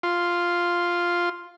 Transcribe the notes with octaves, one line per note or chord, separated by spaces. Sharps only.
F4 C6